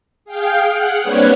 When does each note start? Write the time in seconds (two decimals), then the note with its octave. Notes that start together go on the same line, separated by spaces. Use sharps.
0.25 G#4 F5 G5
0.68 F#5
1.02 G3 A#3 C4 D4 B4 C#5